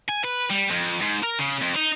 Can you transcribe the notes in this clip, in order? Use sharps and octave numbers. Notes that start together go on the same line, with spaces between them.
G#5
B4
G3
F2
G#2
A#4
C#3
F2
D#4